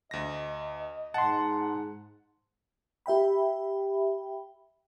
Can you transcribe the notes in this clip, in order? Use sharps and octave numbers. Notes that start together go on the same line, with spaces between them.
D2 D#5 A#6
G#2 F#5 A5 C6
G4 E5 G5 B5